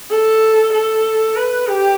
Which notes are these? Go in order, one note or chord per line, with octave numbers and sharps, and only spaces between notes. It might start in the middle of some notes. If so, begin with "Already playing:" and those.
A4
A4
B4
G4